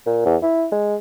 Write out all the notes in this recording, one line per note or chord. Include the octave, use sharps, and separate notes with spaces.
A#2
E2
E4
G#3